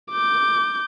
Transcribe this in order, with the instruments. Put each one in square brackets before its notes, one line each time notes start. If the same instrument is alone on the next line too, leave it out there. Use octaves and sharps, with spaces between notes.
[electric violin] D6 G6